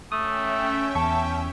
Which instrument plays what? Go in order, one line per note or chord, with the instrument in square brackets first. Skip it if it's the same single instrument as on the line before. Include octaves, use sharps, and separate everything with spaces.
[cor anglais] A3 [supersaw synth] C#4 E5 G5 [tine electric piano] D#6
[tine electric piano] E2 C#6 [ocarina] A5